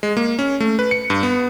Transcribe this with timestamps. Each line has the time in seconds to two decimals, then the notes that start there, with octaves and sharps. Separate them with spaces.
0.03 G#3
0.17 A#3
0.39 C#4
0.60 A3
0.79 B4
0.91 C#7
1.10 G2
1.23 B3